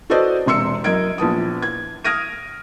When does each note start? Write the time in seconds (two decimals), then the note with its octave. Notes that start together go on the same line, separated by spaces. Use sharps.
0.10 F#4 A4 B4 C5 D5 D#5
0.46 E1 C3 C6 E6 C#7
0.84 F#2 A#4 D#5 G#6 D7
1.18 A#1 B3 A5 D#6
1.62 G#6
2.04 D#6 F6 G#6 A#6 D7 D#7